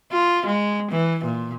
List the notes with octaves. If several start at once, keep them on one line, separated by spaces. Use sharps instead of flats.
F4
G#3
E3
A#2